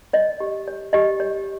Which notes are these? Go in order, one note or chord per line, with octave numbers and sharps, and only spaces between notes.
C#5 D#5
G4
C#5
G4 D#5
C#5